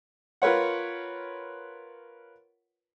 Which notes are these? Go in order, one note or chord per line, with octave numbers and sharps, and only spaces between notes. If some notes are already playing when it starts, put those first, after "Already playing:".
F4 A#4 B4 C#5 F#5